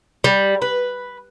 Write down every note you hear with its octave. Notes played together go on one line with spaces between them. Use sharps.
G3
B4